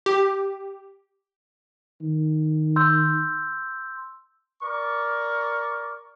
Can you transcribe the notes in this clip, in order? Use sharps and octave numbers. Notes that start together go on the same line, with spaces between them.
G4
D#3
C6 E6 G6
A#4 D5 C#6